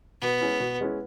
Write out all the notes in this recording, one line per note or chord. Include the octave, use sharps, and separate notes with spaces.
B2 B3
G#3 C#4 E4
B2
G#3 C#4 E4